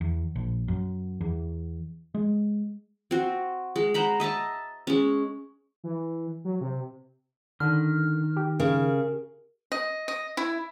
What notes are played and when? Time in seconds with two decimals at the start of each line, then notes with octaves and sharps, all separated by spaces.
0.01 E2
0.35 A#1
0.68 F#2
1.21 E2
2.15 G#3
3.11 C4 F#4
3.76 G#3
3.94 C5 F#5 A#5 B5
4.20 D#5 E5 A5 A#5
4.87 G#3 C#4
5.84 E3
6.45 F#3
6.61 C3
7.60 D3 D#3 F6
8.37 G4
8.60 C#3 A#4
9.72 D#5
10.08 D#5
10.37 E4